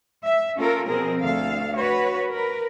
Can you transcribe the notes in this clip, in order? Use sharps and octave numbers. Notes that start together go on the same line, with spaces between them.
E5
A#3 C#4 F4 A4 A#4
B2 F3 C4 G#4 A#4
D2 A4 F5
F#4 B4 C#5
A#4 B4